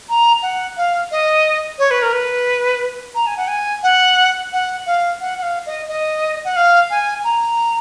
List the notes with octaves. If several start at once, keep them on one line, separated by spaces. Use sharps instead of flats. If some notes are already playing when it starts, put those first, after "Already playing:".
A#5
F#5
F5
D#5
C#5
B4
A#4
B4
A#5
G#5
F#5
G#5
F#5
F#5
F5
F#5
F#5
F5
D#5
D#5
F#5
F5
G#5
A#5